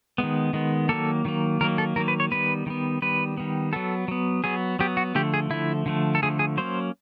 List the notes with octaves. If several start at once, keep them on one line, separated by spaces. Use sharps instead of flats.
D#3 G#3 B3
D#3 G#3 B3
D#3 F#3 A#3 A4
D#3 F#3 A#3
D#3 F#3 A#3 A#4
A4
D#3 F#3 A#3 A#4
B4
C#5
D#3 G3 B3 B4
D#3 G3 B3
D#3 G3 B3 B4
D#3 G3 B3
F#3 B3 A4
F#3 B3
F#3 B3 G#4
F#3 B3 G4
F#4
D3 F3 A3 G4
G#4
D3 F3 A3 E4
D3 F3 A3
A4
D3 F3 A3 G#4
G#4
F#3 A#3 C#4 C5